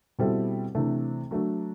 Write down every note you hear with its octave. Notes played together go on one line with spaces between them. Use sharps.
B2 G3 C4 E4 A4
C3 E3 A3 D4
F#3 A3 D4